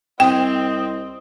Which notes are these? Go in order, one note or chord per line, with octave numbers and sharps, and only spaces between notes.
C2 C4 D#5 G5